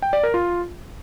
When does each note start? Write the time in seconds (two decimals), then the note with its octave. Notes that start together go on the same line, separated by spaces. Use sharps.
0.02 G5
0.13 D5
0.23 A#4
0.34 F4